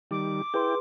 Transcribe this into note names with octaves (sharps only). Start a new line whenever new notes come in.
D#3 G3 D6
E4 G#4 B4 G5 C6